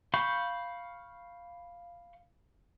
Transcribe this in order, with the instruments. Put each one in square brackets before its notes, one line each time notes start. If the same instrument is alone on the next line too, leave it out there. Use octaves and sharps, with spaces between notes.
[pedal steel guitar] F5 B5 C#6 G6